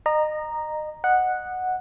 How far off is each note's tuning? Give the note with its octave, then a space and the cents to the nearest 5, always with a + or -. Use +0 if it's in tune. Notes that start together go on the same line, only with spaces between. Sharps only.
D#5 -30 A#5 +0
D#5 -25 F#5 -5